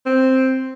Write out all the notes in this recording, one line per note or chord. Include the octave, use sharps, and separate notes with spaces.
C4